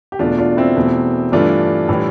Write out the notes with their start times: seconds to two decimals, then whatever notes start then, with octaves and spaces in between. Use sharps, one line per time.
0.12 G4
0.19 E2 B2 A3 D4 F4
0.39 D4 F4
0.57 C4 E4
0.76 E2 B2 A3
1.32 G2 E3 A3 D4 F4
1.89 A2 E3 G3